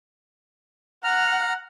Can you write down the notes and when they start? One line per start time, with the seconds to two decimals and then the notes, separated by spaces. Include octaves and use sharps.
1.04 F#5 A#5 F6